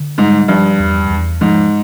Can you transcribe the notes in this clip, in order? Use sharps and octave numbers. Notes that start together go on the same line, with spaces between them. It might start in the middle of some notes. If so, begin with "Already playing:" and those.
Already playing: D3
G#2 G3
G2 F3
E2
E2
G#2 F3